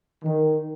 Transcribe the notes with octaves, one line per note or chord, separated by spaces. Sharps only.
D#3